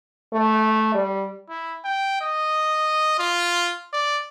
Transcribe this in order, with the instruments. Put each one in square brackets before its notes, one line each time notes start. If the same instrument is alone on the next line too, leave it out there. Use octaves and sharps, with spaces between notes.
[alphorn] A3
G3
[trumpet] E4
G5
D#5
F4
D5